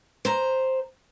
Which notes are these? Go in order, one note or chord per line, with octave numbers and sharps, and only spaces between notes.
C5 A#5